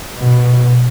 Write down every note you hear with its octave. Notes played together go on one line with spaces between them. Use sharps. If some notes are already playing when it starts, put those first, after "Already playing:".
B2